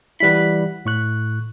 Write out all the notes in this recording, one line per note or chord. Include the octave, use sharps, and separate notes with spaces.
E3 G3 E4 F#5 B5
A2 C#6 F#6